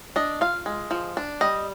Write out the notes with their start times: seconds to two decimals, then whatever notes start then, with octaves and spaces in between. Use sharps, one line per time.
0.16 D4 D#5
0.41 F4 F5
0.66 G#3
0.91 F3
1.17 D4
1.41 G3 D#5